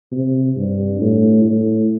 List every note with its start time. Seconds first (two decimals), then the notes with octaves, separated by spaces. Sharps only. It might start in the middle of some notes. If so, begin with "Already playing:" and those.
0.12 C3
0.57 G2
1.01 A2
1.45 A2